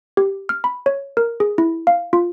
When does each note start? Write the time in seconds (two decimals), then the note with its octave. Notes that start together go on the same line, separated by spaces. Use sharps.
0.17 G4
0.49 F6
0.64 B5
0.86 C#5
1.17 A#4
1.40 G#4
1.58 E4
1.87 F5
2.13 F4